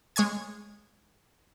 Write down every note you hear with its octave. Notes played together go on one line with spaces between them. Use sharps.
G#3 C#5 G#5 G#6